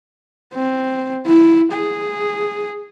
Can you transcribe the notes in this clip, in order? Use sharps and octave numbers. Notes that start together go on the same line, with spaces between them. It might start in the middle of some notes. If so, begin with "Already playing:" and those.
C4
E4
G#4